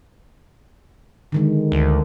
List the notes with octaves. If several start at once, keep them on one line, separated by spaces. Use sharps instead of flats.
D3 D#3 G#3
D2